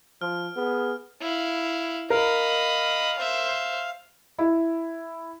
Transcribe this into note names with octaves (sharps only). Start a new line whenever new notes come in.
F3 F6
B3 G#4
E4 F5
A#4 D#5 F5 B5
C5 E5
E4